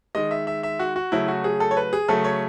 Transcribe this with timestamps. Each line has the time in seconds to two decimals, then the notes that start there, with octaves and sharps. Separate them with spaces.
0.15 D#3 G#3 D#5
0.31 E5
0.47 E5
0.63 E5
0.79 F#4
0.96 F#4
1.12 C#3 F#3 A3 E4
1.28 F#4
1.44 G#4
1.60 A4
1.71 C#5
1.77 B4
1.93 G#4
2.08 C#3 F#3 A3 A4
2.24 C#5